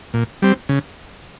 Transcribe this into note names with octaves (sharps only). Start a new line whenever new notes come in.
A#2
G3 C4
C#3